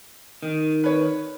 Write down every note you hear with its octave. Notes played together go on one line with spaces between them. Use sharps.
D#3
B4 C#5